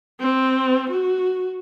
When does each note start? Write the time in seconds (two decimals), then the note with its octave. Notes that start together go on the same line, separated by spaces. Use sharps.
0.21 C4
0.90 F#4